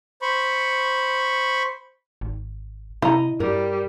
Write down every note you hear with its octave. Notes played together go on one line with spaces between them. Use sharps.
C5 B5 C#6
G#1
C3 E4 D#5 A#5
G2 G3 A#4